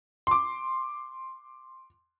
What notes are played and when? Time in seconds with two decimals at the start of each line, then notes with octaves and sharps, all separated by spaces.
0.27 C6 D6